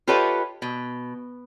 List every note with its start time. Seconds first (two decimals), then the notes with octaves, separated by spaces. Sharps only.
0.07 F4 G4 A4 B4 C#5 D#5
0.62 B2